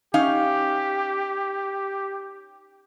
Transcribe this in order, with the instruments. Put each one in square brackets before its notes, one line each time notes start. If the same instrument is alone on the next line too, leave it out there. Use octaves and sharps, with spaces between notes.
[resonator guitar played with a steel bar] C#4 D#4 F5 [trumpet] G4